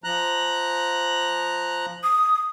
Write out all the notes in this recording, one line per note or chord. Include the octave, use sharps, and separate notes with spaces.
F3 A#5 F#6
D#6